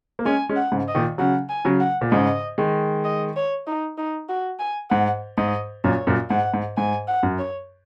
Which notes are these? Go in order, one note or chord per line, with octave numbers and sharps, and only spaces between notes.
A#3
G#3 C#4 G#5
G#3 C#4
F#5
G#2 C#3
D#5
A#2 D#3
C#3 F#3 F#5
G#5
C#3 F#3
F#5
A#2
G#2 C#3 D#5
D#3 G#3
D#5
C#5
D#4
D#4
F#4
G#5
G#2 F#5
G#2 D#5
F#2 A#2 C#5
F#2 A#2
G#2 F#5
G#2
G#2 G#5
F#5
F#2
C#5